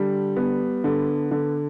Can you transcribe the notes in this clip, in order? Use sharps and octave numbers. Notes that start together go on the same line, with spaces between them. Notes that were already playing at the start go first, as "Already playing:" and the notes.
Already playing: D3 G3
B3
D3
D3